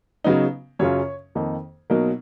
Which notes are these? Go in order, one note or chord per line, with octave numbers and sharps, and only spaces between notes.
C#3 F#3 B3 D#4
F#2 C#3 F#3 C#4 F4 C#5
F2 D#3 A#3 D#4
B2 F#3 A#3 D#4 A#4